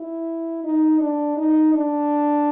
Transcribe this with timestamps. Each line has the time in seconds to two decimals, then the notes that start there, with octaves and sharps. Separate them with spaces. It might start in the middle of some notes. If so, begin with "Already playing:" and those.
Already playing: E4
0.64 D#4
1.00 D4
1.37 D#4
1.74 D4